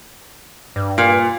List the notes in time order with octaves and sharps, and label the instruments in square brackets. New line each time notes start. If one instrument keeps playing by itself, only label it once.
[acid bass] G2
[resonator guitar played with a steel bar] A#2